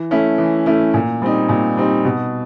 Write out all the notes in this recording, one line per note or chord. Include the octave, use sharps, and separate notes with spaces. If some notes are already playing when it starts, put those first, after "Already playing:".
Already playing: E3
A3 C#4 E4
E3
A3 C#4 E4
A#2
G3 C4 D#4
A#2
G3 C4 D#4
B2